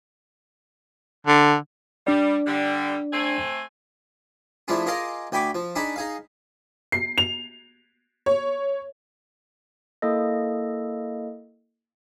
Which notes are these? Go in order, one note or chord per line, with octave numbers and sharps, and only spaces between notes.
D3
G3 D4 D5
D3 G3
A3 C4 G#5
F3 A3 D4 E4 F4 G#4
F4 G#4 A#4 D5 D#5 F5
D2 G5 G#5 B5 C#6 D6
F3
D4 D#4 G#4 A5 B5
D#4 G#4 F5
C7
F7
C#5
A#3 E4 A4 D#5